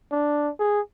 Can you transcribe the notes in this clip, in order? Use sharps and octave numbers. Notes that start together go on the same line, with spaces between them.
D4
G#4